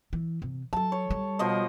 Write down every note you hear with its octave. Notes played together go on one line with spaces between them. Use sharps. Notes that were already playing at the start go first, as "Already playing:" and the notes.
E3
C3
F#3 A4 A5
C#5
G3
B2 F3 D#5